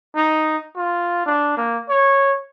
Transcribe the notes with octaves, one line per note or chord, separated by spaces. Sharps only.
D#4
F4
D4
A#3
C#5